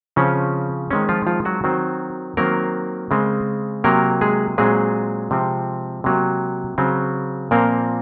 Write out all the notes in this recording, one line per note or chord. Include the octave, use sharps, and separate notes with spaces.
C#3 F3 C4 C#4
D#3 G#3 C4 C#4
F3 F4
F3 F4
F#3 F#4
D#3 F#3 C4
D#3 F#3 A#3 C4 A#4
C#3 G#3 C4
C3 F#3 A#3 A#4
G#3 G#4
A#2 F#3 G#3 C4 G#4
C3 F3 C4
C3 F#3 A#3
C#3 F#3 C4
A#2 F3 A#3 C4 A#4